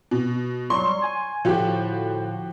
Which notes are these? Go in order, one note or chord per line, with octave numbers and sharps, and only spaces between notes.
B2
F#3 G3 C6 C#6
G#5
A2 D3 F3 F#4 G4